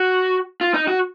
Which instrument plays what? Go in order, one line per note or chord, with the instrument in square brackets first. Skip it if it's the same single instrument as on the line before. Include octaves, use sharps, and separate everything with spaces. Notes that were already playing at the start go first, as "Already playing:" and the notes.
Already playing: [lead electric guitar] F#4
F4
D#4
F#4